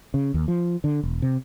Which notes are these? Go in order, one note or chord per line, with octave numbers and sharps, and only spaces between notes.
C#3
D#2
F3
D3
E1
C3